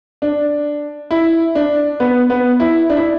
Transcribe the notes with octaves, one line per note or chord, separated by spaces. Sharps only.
D4
E4
D4
B3
B3
E4
D4
E4